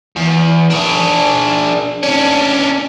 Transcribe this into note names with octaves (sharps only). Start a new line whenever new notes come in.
E2
D4 G#4
C#4 D4